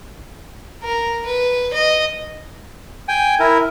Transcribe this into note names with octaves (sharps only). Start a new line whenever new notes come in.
A#4
B4
D#5
G5 G#5
E4 A#4